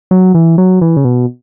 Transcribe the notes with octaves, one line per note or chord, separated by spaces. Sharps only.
F#3
E3
F#3
E3
C#3
B2